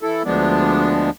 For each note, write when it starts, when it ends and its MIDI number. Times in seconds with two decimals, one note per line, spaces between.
0.02 0.23 52
0.02 0.23 64
0.02 0.23 69
0.25 1.10 38
0.25 1.10 53
0.25 1.10 56
0.25 1.10 59
0.25 1.10 62